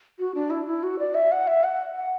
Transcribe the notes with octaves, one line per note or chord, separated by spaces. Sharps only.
F#4
D4
E4
E4
F#4
D5
E5
F#5
E5
F#5
F#5